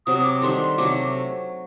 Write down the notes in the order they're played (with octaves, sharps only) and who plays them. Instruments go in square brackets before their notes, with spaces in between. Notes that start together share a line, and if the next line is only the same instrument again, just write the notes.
[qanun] C3 F#3 C4 [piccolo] D#6
[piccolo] D#6
D6
[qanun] D#3 G3 D4 A4 [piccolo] C6
[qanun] C3 F#3 A3 [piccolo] D6